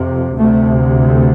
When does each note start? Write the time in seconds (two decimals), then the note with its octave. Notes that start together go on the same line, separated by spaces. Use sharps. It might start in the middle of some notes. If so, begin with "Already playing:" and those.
Already playing: F2 C3
0.38 D2 C3 A3
1.05 A3